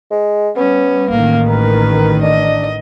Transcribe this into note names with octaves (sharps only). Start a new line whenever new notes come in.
G#3
G3 B3 C#4
A1 D#3 A#3
A#4 B4
D4 D#5